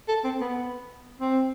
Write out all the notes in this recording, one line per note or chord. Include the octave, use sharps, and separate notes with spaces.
A4
C4
B3
C4